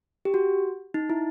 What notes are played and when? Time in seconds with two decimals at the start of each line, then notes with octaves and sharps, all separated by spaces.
0.25 G4
0.34 F#4
0.94 D#4
1.10 E4